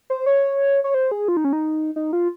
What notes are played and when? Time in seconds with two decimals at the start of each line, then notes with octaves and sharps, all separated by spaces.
0.10 C5
0.26 C#5
0.84 C#5
0.94 C5
1.11 G#4
1.28 F4
1.37 D#4
1.45 C#4
1.53 D#4
1.96 D#4
2.13 F4